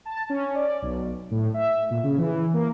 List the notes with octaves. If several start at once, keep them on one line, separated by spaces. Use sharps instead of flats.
A5
C#4
D5
B1
A2
E5
A#2
C#3
E3
A#3